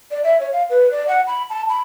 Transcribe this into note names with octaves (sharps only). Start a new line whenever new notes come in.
D5
E5
C#5
F5
B4
D5
F#5
B5
A5
B5